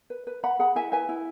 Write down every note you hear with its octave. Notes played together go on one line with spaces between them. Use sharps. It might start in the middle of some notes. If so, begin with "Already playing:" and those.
B4
B4
B4 F#5 B5
G#4 F#5 B5
E4 E5 G#5
B4 E5 G#5
E4